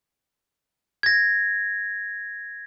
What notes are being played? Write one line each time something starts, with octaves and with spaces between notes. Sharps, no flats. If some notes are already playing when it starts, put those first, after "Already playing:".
G#6 A#6